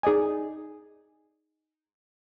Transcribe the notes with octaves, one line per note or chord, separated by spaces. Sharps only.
D#4 G#4 D5 D#5 G#5